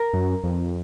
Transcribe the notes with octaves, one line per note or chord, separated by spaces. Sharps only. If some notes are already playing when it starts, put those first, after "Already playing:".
Already playing: A#4
F#2
F2